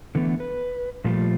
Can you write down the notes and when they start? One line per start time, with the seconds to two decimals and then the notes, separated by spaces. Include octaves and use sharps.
0.15 D3 E3 A3 B3
0.40 B4
1.04 A#2 F3 G3 A3 F4